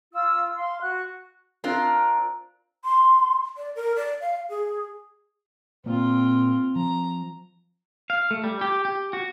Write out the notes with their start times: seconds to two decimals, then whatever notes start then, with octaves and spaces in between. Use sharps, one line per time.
0.13 F4 E6
0.56 F5 C6
0.81 F#4 F#6
1.64 C4 D4 F4 A#4
2.84 C6
3.57 D5
3.75 A#4
3.96 D5
4.21 F5
4.49 G#4
5.86 A#2 A#3 C4 F4
6.76 F3 A#5
8.10 F5
8.31 A3
8.44 G3
8.61 G4
8.85 G4
9.13 F#4